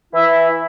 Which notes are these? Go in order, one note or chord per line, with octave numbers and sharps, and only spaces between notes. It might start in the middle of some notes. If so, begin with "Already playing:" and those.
E3 E4 E5